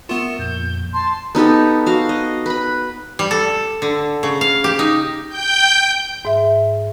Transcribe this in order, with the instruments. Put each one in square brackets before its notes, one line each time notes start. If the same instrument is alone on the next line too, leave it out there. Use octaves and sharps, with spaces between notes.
[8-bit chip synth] B3 F4 [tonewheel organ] A#4 E5 C#6 [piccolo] E7
[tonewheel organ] F2 A#2 [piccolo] G6
[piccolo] A5 [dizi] C6
[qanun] B3 D#4 G4 A4
F#4 F5
D#5
B4 B5
[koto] G3
A4
D3
C#3
F5
G4
D#4
[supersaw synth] G5 G6
[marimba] G#2 E5